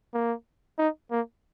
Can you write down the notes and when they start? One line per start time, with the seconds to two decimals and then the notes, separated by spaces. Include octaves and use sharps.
0.14 A#3
0.79 D#4
1.11 A#3